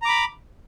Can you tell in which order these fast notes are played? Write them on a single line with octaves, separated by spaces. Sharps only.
A#5 D6 B5